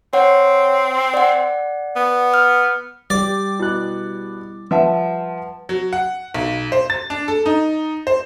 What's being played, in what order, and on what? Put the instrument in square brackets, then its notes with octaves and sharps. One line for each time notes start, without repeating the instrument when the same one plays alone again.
[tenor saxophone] C4 [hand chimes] C#5 F#5
[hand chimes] D5 F#5
[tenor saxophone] B3
[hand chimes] F6
[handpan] G3 G4 [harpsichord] D5
[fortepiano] B2 F#6 [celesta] E4
[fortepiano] F3 E5 [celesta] B4 F#5 A5
[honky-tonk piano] F#3
F#5
B1
C5
A6
D4
A4
D#4
C5